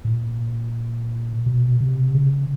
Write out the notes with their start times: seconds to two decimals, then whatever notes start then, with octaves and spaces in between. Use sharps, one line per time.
0.05 A2
0.10 A#2
1.46 B2
1.81 C3
2.15 C#3